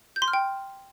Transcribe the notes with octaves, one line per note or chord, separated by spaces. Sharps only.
G6
C6
F6
G5